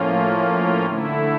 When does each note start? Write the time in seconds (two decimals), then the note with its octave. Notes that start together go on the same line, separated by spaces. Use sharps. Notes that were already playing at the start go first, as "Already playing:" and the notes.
Already playing: A2 F3 A#3 C#4 F4
0.86 D3 A3 E4